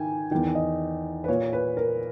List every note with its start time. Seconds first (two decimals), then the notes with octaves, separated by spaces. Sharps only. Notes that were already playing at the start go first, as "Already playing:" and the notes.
Already playing: G#2 D#3 G5 G#5
0.31 E2 D#3 G5
0.55 D#5
1.24 B4
1.28 A#2 C#5
1.53 B4
1.77 A#4